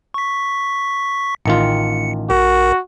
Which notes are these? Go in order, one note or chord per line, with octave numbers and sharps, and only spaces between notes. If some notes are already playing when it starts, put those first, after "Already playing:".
C#6 B6
A1 D#3 F4 C#7
A#1 F#4 A#4